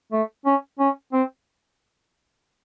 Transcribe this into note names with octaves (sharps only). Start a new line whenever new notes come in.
A3
C#4
C#4
C4